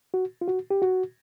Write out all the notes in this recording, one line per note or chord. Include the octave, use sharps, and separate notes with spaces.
F#4
F4
F#4
G4
F#4